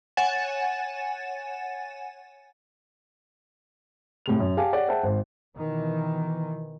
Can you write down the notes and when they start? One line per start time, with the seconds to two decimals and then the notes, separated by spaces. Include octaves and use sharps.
0.17 C#5 F#5 G#5 A6 E7
4.26 A2 C3 F7
4.40 F#2
4.57 G4 F5 G#5 A5
4.73 G4 C#5 D5 F#5
4.88 G#4 C5 E5 F#5 G5 A5
5.03 G#1 C5
5.56 B2 D#3 E3